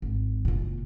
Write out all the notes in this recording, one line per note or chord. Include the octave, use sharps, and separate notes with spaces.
G#1
F#1 A#2